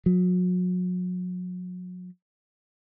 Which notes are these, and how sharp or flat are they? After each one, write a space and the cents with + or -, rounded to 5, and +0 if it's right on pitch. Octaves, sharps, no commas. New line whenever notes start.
F#3 -35